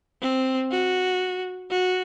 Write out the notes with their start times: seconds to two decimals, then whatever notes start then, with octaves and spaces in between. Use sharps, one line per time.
0.22 C4
0.71 F#4
1.71 F#4